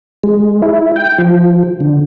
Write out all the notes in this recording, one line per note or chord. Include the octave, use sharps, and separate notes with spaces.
G#3
E4
G5
F3
D3